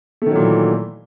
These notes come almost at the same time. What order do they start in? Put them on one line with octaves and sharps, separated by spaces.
A3 D#3 F#3 A#2 E3